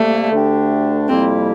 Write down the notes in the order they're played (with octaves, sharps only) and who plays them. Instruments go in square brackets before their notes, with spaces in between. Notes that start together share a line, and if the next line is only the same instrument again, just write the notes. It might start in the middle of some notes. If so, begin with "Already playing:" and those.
Already playing: [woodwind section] C3 G3 A#3 [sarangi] A3
[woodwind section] D2 D3 A3 D4 G4
[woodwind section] F2 C3 G3 A#3 E4 [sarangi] C4